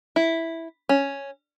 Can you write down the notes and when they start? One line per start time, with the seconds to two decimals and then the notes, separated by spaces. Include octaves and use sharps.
0.16 E4
0.89 C#4